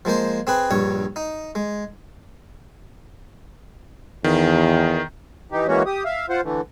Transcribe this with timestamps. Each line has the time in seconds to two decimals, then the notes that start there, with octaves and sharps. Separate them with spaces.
0.05 F3 G#3 A#3 C5
0.47 C4 G#4 B4
0.71 A#1 G2 C#5
1.16 D#4
1.55 G#3
4.24 E2 D#3
5.50 E3 D#4 G4
5.68 E3 G#3 A#3 C#4 F#4 C#5
5.86 G4 D#6
6.05 E5 F5
6.29 F4 C5 F#5
6.43 D3 E3 A3